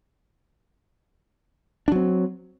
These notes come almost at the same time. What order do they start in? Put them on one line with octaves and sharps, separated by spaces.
D4 F#3 C4